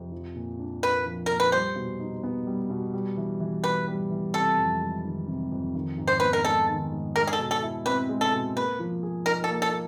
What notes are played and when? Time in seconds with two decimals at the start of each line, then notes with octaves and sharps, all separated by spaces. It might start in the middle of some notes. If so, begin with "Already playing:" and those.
Already playing: F2 C3
0.12 F3
0.36 A#2
0.59 D4
0.83 A#3 B4
1.06 F3
1.26 A#2 A#4
1.40 B4
1.52 G3 C5
1.76 B2
2.00 D#4
2.23 B3
2.47 G3
2.70 B2
2.93 G3
3.17 E3
3.40 E3
3.63 B3 B4
3.88 G3
4.10 E3
4.34 C3 A4
4.58 F2
4.81 G#3
5.04 D#3
5.28 C3
5.52 F2
5.75 D#3
5.98 G#2
6.08 C5
6.20 B3 B4
6.33 A#4
6.44 G#3 A4
6.69 D#3
6.92 G#2
7.16 G#3 A#4
7.27 G#4
7.33 A4
7.39 B2
7.51 A4
7.62 E4
7.85 C4 B4
8.09 G#3
8.21 A4
8.33 B2
8.56 A#3 B4
8.80 F3
9.03 G#4
9.26 D#4 A#4
9.44 A4
9.50 A#3
9.62 A4